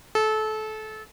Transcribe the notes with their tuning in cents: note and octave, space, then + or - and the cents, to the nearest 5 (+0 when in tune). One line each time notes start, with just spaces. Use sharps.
A4 -25